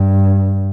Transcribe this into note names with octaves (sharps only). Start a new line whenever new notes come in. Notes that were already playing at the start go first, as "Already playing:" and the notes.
Already playing: G2